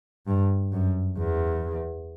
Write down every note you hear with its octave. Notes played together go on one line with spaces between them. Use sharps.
G2
F#2
E2